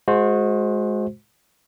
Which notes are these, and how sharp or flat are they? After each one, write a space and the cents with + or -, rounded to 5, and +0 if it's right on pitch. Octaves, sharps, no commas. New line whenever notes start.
G#3 +15 F#4 -25 C5 +0